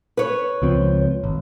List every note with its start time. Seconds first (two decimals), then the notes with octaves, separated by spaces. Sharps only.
0.17 B4 C#5
0.62 C#2 F3 C4
1.24 G#1